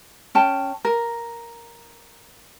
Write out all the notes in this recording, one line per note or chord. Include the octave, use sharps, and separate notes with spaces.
C#4 G5 A5
A#4